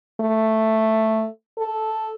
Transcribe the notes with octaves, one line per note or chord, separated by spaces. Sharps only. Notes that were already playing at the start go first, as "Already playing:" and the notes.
A3
A4